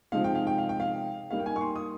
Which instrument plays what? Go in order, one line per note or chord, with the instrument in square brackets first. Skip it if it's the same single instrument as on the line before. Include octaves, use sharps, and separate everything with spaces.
[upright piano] C3 F3 G#3 D#4 F5
G5
F5
G5
F5
G5
F5
G3 A#3 D#4 F5
G5
G#5
C#6
C6
D#6